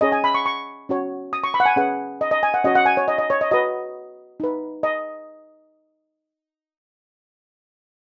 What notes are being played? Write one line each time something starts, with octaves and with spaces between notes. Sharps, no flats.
C#4 G#4 C#5 D#5
G#5
B5
C#6
C#6
C#4 F#4 C#5
D#6
C#6
B5
F#5
G#5
C#4 G#4 B4 F#5
D#5
D#5
G#5
F#5
C#4 F#4 C#5 D#5
F#5
G#5
C#5
D#5
D#5
C#5
D#5
F#4 B4 D#5
D#4 B4
D#5